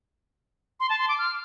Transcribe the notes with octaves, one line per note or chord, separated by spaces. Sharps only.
C6
A5
C6
D6
F6